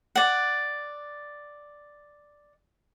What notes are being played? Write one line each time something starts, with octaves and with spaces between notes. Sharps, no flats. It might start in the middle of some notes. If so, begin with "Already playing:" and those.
D5 F#5